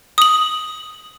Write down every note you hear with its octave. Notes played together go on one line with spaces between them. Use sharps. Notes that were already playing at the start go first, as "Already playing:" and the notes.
D#6 F#7